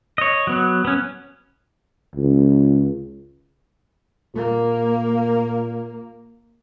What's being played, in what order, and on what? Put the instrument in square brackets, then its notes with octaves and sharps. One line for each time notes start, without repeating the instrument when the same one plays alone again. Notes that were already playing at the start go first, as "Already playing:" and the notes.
[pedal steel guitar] C#5 D#5
F#3 B3
B3 C#4
[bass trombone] C#2
[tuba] A#2 [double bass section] A#3